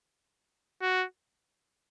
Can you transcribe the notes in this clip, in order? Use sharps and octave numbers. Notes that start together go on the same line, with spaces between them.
F#4